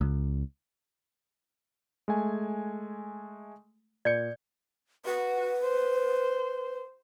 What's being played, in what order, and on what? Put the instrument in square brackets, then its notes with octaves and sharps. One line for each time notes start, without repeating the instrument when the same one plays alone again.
[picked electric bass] C#2
[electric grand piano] G#3 A3 G#5
[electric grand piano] A#2 G6 C#7 [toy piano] D5
[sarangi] F#4 [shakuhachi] B4
[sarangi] C5